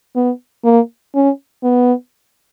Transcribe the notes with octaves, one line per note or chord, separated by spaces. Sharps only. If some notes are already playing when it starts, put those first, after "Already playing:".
B3
A#3
C#4
B3